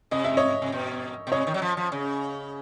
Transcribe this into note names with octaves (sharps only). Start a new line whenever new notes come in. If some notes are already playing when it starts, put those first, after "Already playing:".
C3 D#5
E5
C#5 D#5
C3
B2
B2
C3 C#5 D#5
D#3
F#3
F3
F3
C#3